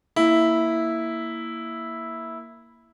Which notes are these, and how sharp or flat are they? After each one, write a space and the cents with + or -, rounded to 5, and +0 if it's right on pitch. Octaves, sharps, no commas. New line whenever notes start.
A#3 +0 E4 -5